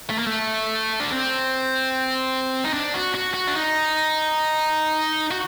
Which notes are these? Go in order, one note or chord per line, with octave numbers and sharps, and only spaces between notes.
A3
A#3
A3
D4
C4
D#4
D4
F#4
F#4
F#4
D4
D#4
F#4